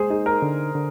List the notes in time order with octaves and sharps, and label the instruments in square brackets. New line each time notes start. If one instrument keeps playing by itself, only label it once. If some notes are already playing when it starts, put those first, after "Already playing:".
Already playing: [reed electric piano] G#3 [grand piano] G#4 C5
[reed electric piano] D#4 [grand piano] G#4
[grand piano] A#4
[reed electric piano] D3
D3